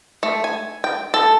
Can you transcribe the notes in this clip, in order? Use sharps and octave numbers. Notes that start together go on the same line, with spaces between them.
A3
G#5
G5
A4